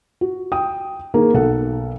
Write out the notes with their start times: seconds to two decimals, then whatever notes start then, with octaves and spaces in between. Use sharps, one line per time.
0.21 F#4
0.52 G5 D#6
1.14 D#3 A#3 G#4 A#4
1.34 B1 A4 F#5